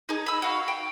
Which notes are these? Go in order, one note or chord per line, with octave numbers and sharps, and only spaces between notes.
D#4 G#4
B5 E6
F#4 F5
G5